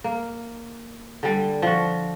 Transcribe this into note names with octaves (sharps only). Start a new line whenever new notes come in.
A#3
D3 G3
F3 F#4